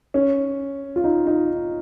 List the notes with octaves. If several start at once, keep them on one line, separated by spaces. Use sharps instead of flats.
C#4
F4
D#4
D#4